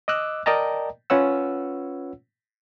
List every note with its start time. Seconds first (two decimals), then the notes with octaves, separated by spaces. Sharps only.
0.08 D#5 D6 E6 F#6
0.46 A#4 D5 D#5 G5 A5 A#5
1.10 C#4 F4 B4 C#5 F#5 E6